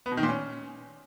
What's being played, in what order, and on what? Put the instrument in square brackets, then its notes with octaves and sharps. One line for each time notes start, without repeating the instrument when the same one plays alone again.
[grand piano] B3
B2
D#3
A#2
C#4